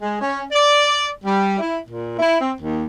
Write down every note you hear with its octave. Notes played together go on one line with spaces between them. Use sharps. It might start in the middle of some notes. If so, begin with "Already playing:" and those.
G#3
C#4
D5
G3
E4
A#2
E4
C4
D#2